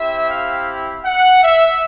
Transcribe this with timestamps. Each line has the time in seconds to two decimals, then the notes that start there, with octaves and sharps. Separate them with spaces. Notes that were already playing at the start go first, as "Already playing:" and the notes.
Already playing: C4 E4 G4 E5
0.28 F5
1.05 F#5
1.44 E5